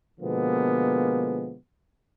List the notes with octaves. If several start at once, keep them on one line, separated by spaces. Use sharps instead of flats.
B2 D3 F3 G#3 A#3 B3